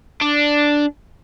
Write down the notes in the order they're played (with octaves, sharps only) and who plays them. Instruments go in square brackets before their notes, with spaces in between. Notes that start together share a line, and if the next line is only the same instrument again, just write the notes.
[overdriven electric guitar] D4